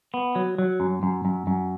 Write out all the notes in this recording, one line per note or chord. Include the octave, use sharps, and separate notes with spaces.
B3
F#3
F#3
F#2
F#2
F#2
F#2